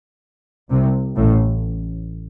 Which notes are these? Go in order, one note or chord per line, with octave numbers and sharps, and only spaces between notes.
C2 C3
A1 A2